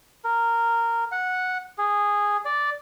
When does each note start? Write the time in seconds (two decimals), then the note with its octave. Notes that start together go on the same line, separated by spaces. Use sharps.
0.24 A#4
1.12 F#5
1.78 G#4
2.45 D5